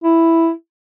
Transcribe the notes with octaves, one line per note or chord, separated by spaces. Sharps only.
E4